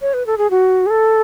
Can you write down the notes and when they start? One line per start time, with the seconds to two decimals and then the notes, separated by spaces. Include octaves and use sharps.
0.02 C#5
0.14 B4
0.27 A4
0.38 G#4
0.51 F#4
0.86 G#4
0.90 A4